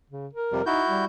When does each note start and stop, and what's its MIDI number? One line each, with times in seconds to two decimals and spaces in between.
0.10 0.27 49
0.33 0.65 70
0.52 0.62 41
0.52 0.62 48
0.52 0.62 55
0.66 0.81 63
0.66 1.05 64
0.66 1.05 66
0.66 1.05 91
0.88 1.06 55